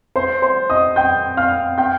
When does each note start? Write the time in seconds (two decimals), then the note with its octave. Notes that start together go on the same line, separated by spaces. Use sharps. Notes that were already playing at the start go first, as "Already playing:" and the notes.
0.16 C5 C6
0.42 C5 C6
0.70 D#5 D#6
0.96 G5 G6
1.37 F5 F6
1.78 G5 G6